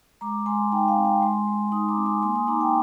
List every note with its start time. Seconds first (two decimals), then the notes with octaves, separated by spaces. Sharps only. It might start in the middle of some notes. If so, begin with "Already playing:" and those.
0.21 G#3 A#5 D6
0.46 G#3 G#5 C6
0.72 D#4 G5 A#5
0.88 F5 G#5
0.98 C4
1.05 G5 A#5
1.22 G#3 G#5 C6
1.47 G#3
1.72 D#4 C6 D#6
1.88 A#5 D6
1.97 C4
2.06 G#5 C6
2.22 A#3 G#5 C6
2.35 C6 D#6
2.47 D#4 A#5 D6
2.60 G5 A#5